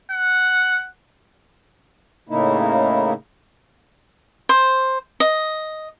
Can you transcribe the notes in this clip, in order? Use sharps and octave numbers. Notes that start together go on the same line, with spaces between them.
F#5
A2 C#3 A#3 D#4 E4
C5
D#5